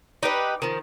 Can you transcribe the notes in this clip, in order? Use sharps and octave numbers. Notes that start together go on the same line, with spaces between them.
D#4 G4 B4
D#3 F3